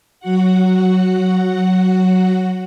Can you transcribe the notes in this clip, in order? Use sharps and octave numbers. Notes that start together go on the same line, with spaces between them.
F#3 F#4 F#5